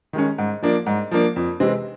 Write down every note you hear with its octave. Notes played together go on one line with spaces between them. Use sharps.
D#3 G#3 C#4
G#2
F3 A#3 D4
G#2
F3 A#3 D4
F2
C3 E3 G#3 C4